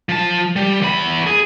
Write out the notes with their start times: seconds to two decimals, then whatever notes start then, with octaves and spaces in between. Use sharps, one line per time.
0.09 F3 A5
0.56 G3
0.82 E2 B5
1.27 G#4